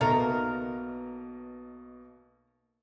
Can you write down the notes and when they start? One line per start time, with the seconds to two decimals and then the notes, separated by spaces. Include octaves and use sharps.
0.01 B1 B2 A3 A#3 A#4 D#5